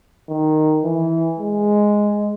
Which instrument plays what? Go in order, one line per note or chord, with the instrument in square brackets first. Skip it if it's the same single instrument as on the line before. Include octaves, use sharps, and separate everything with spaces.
[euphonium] D#3
E3
G#3